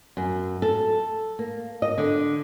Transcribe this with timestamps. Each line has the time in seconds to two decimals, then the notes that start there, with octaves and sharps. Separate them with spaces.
0.17 F#2
0.62 A4
1.39 A#3
1.82 D#5
1.98 D3